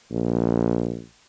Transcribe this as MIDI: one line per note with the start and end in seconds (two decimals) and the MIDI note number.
0.11 1.02 34